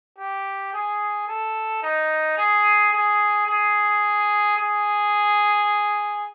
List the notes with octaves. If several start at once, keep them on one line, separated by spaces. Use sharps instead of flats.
G4
G#4
A4
D#4
G#4
G#4
G#4
G#4